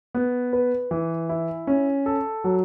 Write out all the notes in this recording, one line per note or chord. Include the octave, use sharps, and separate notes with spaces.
B3
B4
E3
E4
C#4
A4
F#3